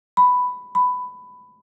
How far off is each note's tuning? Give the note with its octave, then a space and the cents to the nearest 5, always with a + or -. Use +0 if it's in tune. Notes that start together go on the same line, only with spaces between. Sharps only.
B5 +5
B5 +10